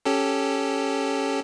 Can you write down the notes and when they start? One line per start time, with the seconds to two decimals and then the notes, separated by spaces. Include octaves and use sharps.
0.05 C#4 G4 A4